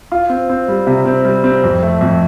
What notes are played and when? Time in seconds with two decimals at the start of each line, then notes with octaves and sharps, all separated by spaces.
0.12 F4
0.30 C4
0.50 C4
0.68 G3
0.87 C3
1.06 C4
1.25 G3
1.44 C4
1.64 F2
1.82 A3
2.01 F2